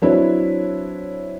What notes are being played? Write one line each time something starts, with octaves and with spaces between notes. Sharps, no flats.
F#3 C4 D4 E4 B4 C#5